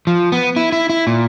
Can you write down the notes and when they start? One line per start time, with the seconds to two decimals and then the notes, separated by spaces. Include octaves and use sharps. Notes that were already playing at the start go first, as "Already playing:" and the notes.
0.07 F3
0.32 B3
0.56 E4
0.72 E4
0.90 E4
1.07 A#2